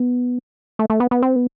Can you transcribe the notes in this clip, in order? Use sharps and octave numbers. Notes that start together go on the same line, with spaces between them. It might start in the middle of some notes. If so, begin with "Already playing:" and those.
Already playing: B3
A3
A3
B3
B3
C4
B3